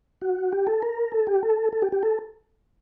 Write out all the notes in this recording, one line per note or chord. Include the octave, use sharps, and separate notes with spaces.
F#4
G4
A4
A#4
A4
G4
A4
A4
G4
G4
A4